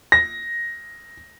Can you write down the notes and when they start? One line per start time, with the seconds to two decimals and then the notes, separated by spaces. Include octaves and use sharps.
0.12 A#6